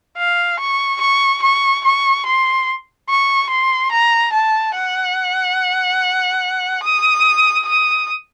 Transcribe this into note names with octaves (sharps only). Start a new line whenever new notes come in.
F5
C#6
C#6
C#6
C#6
C6
C#6
C6
A#5
A5
F#5
D#6
D#6